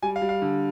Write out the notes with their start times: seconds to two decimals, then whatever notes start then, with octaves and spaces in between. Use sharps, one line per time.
0.03 G3 G#5
0.16 F5
0.22 G3
0.29 F5
0.42 D3